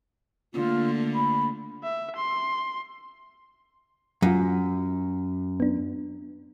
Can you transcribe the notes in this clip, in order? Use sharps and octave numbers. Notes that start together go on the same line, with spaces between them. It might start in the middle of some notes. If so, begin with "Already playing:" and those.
D3 A3 A#3 F4
B5
E5
C6
F#2 F#3 F4
B3 D4